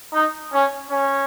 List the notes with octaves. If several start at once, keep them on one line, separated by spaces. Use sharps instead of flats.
D#4
C#4
C#4